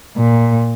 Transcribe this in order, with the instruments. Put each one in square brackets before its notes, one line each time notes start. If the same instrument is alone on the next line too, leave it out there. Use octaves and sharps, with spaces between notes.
[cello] A#2